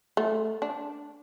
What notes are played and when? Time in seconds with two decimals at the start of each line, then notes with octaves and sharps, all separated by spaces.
0.17 A3
0.62 D4